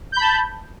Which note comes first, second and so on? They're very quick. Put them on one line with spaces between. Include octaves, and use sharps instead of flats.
G6 B5 A5